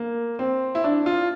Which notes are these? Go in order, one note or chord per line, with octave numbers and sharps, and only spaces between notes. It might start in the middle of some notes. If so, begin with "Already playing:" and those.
Already playing: A#3
C4
E4
D4
F4